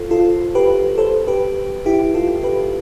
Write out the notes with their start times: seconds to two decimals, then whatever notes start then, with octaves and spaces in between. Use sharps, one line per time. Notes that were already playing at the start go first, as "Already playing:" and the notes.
Already playing: F4 A4 C5
0.11 F4 A4
0.55 G4 B4
0.98 A4 C5
1.27 G4 B4
1.86 E4 G4
2.14 F4 A4
2.43 G4 B4